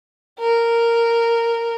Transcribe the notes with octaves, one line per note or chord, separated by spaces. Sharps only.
A#4